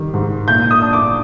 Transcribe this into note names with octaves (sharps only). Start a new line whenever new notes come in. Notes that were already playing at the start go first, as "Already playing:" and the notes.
Already playing: D#3 G3
G#2
A#2 G6
D#6
D4
D6